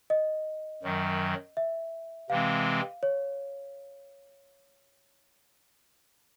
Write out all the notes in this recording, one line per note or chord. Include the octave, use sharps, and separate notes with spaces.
D#5
F#2 D#3 F#3
E5
C3 E3 G#3 C4 F5
C#5